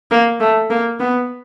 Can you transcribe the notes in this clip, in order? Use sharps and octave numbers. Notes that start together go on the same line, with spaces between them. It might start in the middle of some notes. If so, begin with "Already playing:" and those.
A#3
A3
A#3
B3